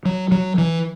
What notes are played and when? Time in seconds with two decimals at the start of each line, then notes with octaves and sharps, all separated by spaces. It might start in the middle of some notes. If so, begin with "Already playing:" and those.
0.05 F#3
0.32 F#3
0.58 E3